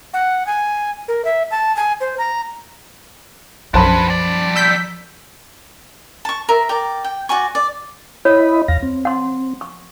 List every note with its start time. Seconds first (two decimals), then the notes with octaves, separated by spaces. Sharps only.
0.14 F#5
0.47 G#5
1.08 A#4
1.25 E5
1.51 A5
1.76 G#5
2.01 C5
2.18 A#5
3.74 B1 F#2 F3 D4 B4 C5 A5 B5
4.07 D#2 D5
4.56 E6 G6 B6
6.25 A5 C#6
6.49 A#4 E5
6.69 A#4 D5 G5
7.04 G5
7.29 F#4 D5 G#5 C#6
7.55 D5
8.25 E4 C#5 D#5 B5
8.68 E2 F5 A#6
8.82 C4
9.05 F#5 C6
9.61 C#6